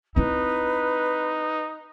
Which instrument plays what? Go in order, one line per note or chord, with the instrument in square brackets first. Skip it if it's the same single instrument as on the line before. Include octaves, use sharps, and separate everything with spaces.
[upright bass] C4 E4 [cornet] D#4 [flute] B4